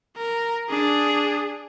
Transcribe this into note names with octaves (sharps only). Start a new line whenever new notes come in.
A#4
D4 G#4